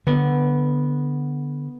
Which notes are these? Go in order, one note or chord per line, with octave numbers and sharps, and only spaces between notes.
D3 B3